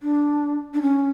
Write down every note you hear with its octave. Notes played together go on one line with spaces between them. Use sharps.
D4
D4
C#4